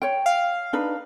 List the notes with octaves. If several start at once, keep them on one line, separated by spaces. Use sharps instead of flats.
C#5 G5
F5
D4 D#4 B4